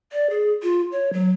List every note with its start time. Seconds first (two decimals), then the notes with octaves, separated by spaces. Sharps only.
0.12 D5
0.30 G#4
0.63 F4
0.92 C#5
1.13 F#3